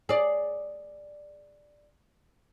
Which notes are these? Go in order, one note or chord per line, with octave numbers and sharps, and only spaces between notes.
G#4 D5